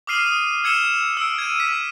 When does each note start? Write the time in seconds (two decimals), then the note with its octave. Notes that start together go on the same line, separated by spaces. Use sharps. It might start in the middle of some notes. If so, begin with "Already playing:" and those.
0.07 D6 D#6 F6 C7 D#7 F#7
0.27 D#6 D#7
0.64 E6 G#6 C#7 E7 G7
1.17 E6 D7
1.38 G#6 D#7
1.60 B6